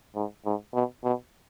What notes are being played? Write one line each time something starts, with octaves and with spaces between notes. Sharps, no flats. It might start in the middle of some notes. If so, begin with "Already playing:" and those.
G#2
G#2
B2
B2